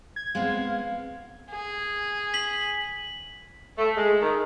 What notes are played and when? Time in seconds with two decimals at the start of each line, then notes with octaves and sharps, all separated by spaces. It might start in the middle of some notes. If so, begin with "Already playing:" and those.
0.16 G#6
0.35 G#3 B3 C4 F5
1.50 G#4
2.34 B6 F#7
3.77 A3
3.97 G#3
4.21 D#3